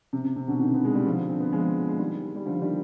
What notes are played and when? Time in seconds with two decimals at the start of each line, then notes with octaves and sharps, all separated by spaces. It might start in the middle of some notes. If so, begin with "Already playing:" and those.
0.13 C3
0.24 C3
0.36 C3
0.47 B2 D3
0.59 C3 D#3
0.74 B3
0.84 G#3
0.95 G3
1.06 D3 F3
1.29 C4
1.40 B3
1.53 F3 G#3
1.89 G#3
1.99 D#3 G3
2.36 G3
2.46 D3 F3
2.61 D#3 G3